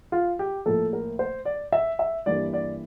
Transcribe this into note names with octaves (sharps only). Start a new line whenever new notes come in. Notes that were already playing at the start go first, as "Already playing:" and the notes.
F4
G4
A2 F3 A#3 A4
A#4
C5
D5
E5
E5
G2 E3 G3 A#3 D5
D5